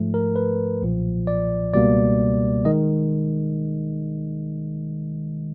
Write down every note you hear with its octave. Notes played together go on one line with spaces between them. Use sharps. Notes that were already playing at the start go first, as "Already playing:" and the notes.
Already playing: G#2 F3 A3
A#4
B4
B1 A#2 F3
D5
C#2 B2 G3 A#3 D5
D#3 G#3 D#5